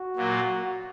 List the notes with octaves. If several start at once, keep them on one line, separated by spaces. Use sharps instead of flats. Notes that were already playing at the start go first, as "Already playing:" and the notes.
Already playing: F#4
A#2 F#3 A#3 F4